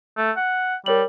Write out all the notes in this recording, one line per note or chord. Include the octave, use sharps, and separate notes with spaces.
A3
F#5
G3 A#4 C#5 F#7